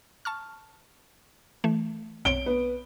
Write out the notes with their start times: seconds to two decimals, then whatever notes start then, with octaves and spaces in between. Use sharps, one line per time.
0.25 A5 C#6 F6
1.64 E3 A3
2.25 B1 C4 C#5 D7 G7
2.46 B3